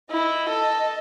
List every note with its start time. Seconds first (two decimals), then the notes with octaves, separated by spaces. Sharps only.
0.11 E4 D#5
0.49 A4